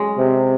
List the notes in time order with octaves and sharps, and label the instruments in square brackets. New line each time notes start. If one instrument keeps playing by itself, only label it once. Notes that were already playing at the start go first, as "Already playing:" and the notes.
Already playing: [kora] G#3 C#4
[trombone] C3